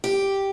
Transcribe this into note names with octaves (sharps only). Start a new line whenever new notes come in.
G4